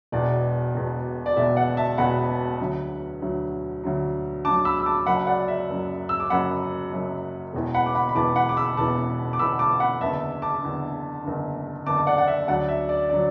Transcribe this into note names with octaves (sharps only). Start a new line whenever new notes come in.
E1 E2 B2 D5
E1 E2 B2
D5
E1 E2 B2 E5
D5 F#5
E5 A5
E1 E2 B2 F#5 B5
D2 D3 F#3
D2 D3 F#3
D2 D3 F#3
D2 D3 F#3 A5 D6
B5 E6
E6
A5 D6
F#1 F#2 F#3 F#5 B5
D5 F#5
E5
F#1 F#2 F#3
E6
D6
F#1 F#2 F#3 F#5 B5
F#1 F#2 F#3
E1 E2 E3
F#5 B5
D6
F#5 B5
B5
E1 E2 E3 A5 D6
F#5 B5
D6
B5 E6
E1 E2 E3 A5 D6
D6
E1 E2 E3 B5 E6
A5 D6
F#5 B5
F#1 E2 D3 E5 A5
A5 D6
F#1 E2 D3
F#1 E2 D3
F#1 E2 D3 A5 D6
A5
D5 F#5
F#5
E5
D2 D3 F#3 D5 F#5
E5
D5
D3 F#3 D5